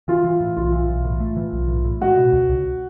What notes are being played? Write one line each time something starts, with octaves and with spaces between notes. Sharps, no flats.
E3 F4
E3
A2
B1 F4
E3
B1
A2
A3
E3
B1
A2
A2
G#3 F#4
B2
C#2
C#2